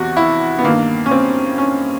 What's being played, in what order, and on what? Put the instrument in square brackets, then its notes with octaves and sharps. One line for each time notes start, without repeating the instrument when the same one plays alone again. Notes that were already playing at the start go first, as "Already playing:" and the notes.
Already playing: [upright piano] E2 C3 F#4
E4
B3
G2 D#3 A#3
C#4
C4
C#4